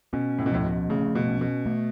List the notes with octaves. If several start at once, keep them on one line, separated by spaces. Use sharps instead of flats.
B2 C#4
A2
B2
A2 F3
B2
C#3 A3
B2
C#4
B2
A3